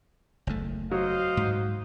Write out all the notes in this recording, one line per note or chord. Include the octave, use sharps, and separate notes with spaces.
F#1 E2 A3
F#3 C5 D#5 F5
G#2